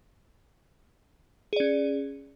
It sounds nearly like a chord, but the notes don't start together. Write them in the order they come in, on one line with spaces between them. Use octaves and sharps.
G#4 D5 C#4